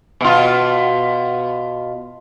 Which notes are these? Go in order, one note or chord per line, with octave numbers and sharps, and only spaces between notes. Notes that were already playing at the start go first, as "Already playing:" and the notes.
B2 F4